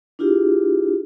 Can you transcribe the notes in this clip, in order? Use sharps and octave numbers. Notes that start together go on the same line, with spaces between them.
D4 E4 F4 G4 G#4